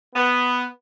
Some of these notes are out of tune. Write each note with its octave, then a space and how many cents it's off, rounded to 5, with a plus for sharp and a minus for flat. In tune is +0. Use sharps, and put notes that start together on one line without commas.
B3 +5